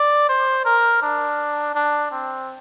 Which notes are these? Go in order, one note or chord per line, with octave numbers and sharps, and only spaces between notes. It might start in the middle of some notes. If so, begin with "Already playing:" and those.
Already playing: D5
C5
A#4
D4
D4
C4